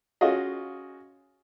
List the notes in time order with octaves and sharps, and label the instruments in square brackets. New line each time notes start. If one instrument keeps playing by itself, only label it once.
[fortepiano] C#4 F4 F#4 G#4 D#5